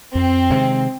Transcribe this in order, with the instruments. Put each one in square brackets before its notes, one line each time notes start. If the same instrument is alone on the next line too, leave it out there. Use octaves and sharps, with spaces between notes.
[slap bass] F2 [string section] C4
[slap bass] C3 D#3 G#3